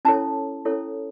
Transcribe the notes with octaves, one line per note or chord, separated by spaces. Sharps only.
C#4 E4 A4 C#5 A5
C#4 E4 A4 C#5